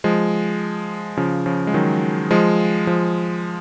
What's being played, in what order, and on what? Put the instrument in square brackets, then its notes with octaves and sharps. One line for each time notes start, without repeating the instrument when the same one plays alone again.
[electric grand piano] F3 G#3
C#3 F3
C#3 F3
G#3
D#3 F#3
F3 G#3
F3 G#3